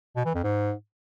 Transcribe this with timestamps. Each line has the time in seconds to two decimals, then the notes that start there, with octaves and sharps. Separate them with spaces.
0.16 B2
0.25 E3
0.34 F2
0.43 G#2